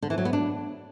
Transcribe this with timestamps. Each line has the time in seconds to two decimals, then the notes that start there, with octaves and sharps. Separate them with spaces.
0.02 D3
0.10 E3
0.18 F#3
0.25 B3
0.33 D4